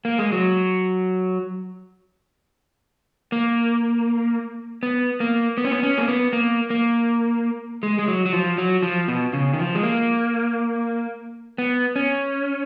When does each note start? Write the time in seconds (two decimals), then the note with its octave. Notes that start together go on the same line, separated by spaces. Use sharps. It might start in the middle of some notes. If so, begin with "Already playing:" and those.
0.05 A#3
0.19 G#3
0.32 F#3
3.32 A#3
4.83 B3
5.20 A#3
5.58 B3
5.65 C#4
5.71 B3
5.83 C#4
5.98 A#3
6.08 B3
6.33 A#3
6.70 A#3
7.83 G#3
7.99 G#3
8.08 F#3
8.26 F#3
8.33 F3
8.58 F#3
8.83 F3
9.08 B2
9.33 C#3
9.53 D#3
9.59 F3
9.75 G#3
9.83 A#3
11.58 B3
11.96 C#4